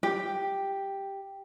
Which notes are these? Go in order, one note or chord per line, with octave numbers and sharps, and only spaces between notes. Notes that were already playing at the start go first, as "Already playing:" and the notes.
G4